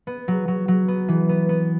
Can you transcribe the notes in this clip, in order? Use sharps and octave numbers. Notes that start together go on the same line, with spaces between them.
B3
F#3
F#3
F#3
B3
E3
B3
B3